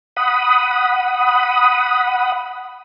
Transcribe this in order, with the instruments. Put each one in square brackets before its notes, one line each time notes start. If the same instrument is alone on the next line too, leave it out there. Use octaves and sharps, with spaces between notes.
[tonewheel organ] F#5 B5 D#6